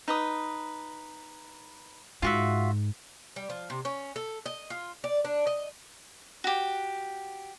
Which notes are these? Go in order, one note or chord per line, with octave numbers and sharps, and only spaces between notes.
D#4 B4 D#6
G#2 F4 F#4 E5
G3
F3
C3
C#4
A4
D#5
F4
D5
D4
D#5
F#4 G4